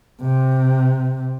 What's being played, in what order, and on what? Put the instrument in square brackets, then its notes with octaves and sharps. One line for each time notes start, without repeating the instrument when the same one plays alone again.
[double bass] C3